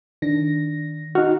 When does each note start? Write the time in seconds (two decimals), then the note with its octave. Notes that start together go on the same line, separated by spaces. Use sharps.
0.22 D#3 D4 A#6
1.15 D#4 F#4 F6